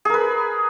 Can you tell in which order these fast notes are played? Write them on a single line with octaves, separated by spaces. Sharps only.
G#4 A#4 B4